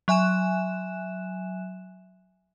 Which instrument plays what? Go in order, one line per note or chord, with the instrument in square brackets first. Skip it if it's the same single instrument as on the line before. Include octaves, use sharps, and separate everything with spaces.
[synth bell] F#3 E5 G#5 F#6 E7